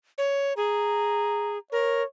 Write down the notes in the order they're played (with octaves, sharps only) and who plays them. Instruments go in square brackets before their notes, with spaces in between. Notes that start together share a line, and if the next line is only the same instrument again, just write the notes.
[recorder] C#5
[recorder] G#4 [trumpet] A#5
[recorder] A#4 [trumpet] C#5